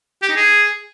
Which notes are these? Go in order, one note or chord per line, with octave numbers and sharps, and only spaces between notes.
G4
D#4
G#4